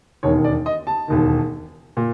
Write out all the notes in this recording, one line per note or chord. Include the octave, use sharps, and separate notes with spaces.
E1 D#2 D#3 C#5
D5
D#5
A5
E1 D#2 D#3
A#2